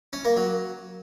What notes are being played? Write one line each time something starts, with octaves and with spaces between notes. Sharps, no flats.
C#4
A#3
F#3